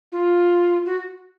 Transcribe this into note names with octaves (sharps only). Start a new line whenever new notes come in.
F4
F#4